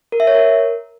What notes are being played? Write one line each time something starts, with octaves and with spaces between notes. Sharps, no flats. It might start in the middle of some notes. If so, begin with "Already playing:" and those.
A#4
E5
C#5
A#4